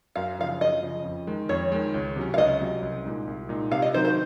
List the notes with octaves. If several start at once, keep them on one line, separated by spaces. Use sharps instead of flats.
F#2 F5
C#3 F3 F5
F#2 D#5
C#3 F3
F2
D#3 G#3
F2 C#5
D#3 G#3
C#2
C3 F#3 C#4
F5
C#2 D#5
C3 F#3 C#4
C2
A#2 G#3 D#4
C2
A#2 G#3 D#4
C3 F5
D#5
D#3 F#3 C4 D#4 C5
C5